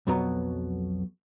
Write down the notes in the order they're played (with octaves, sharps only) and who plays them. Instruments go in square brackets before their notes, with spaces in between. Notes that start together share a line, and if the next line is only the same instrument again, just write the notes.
[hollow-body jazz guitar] B1 F2 B2 F#3 B3 A#5